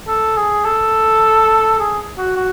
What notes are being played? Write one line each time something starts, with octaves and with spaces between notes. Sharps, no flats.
A4
G#4
A4
G#4
F#4
F#4